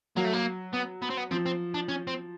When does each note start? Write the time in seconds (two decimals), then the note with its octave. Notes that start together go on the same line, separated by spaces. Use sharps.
0.16 F#3 A#3
0.25 A3
0.33 A#3
0.74 B3
1.02 B3
1.10 C4
1.18 B3
1.31 F3 C4
1.46 C4
1.74 D4
1.89 C#4
2.07 C4